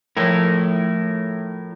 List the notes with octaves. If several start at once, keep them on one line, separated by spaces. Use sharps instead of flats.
A2 F3 E4 A#4 G#6